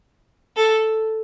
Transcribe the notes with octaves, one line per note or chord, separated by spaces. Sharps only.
A4